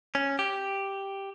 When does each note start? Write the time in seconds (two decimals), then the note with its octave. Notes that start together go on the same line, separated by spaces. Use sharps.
0.15 C#4
0.39 G4